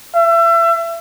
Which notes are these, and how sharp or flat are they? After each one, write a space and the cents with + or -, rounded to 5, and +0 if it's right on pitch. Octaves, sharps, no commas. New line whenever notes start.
E5 +30